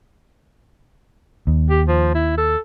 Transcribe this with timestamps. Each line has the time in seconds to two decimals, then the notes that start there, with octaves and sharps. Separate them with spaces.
1.47 D#2
1.70 G4
1.88 F3
2.15 E4
2.38 A4